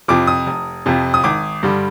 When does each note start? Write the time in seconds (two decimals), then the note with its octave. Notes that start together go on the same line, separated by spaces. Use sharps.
0.08 F2 C3 F3 D6
0.27 D#6
0.47 F1
0.86 F2 C3 F3
1.14 D#6
1.24 G#1 D6
1.63 G2 D3 G3